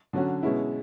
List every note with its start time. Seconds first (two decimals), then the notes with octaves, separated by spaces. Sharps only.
0.13 D3 F#3 C#4 F#4
0.43 B2 G#3 C#4 E4